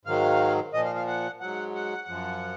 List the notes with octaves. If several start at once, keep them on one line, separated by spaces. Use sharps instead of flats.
G#2 D#3 F#3 F5
A#2 F3 D#5
F5
F5
F#5
G#2 F#3 F#5
F#5
F#2 F3